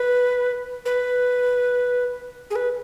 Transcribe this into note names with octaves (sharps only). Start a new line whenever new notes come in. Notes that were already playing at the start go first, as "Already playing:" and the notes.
Already playing: B4
B4
G#4
B4